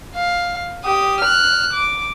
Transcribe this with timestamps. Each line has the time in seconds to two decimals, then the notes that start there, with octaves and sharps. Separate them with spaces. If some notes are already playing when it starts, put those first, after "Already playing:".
0.15 F5
0.85 G4 D#6
1.21 F6 F#6
1.73 D6